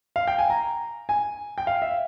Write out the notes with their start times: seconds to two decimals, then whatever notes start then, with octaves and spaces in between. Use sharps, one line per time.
0.16 F5
0.28 G5
0.38 G#5
0.50 A#5
1.09 G#5
1.58 G5
1.67 F5
1.82 E5